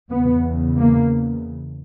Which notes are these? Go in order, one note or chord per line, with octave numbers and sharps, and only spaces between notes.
E2 C#3 B3
A#3